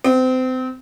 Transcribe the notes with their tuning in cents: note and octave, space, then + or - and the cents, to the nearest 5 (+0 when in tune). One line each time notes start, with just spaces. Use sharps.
C4 -30